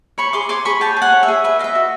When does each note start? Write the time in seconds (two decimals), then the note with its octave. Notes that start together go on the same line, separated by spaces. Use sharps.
0.18 C#5 B5 C#6
0.33 G#4 C6 D6
0.49 C#5 C6 D6
0.65 G#4 B5 C#6
0.81 C#5 G5 A5
0.97 G#4
1.02 F#5 G#5
1.12 C#5
1.23 E5
1.28 G#4
1.44 B4 E5
1.59 D#5 F5
1.64 E5
1.75 F#4